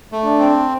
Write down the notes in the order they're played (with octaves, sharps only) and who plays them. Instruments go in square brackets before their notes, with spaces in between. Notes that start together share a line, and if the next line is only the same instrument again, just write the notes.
[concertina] A3
[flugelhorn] D4
[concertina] C4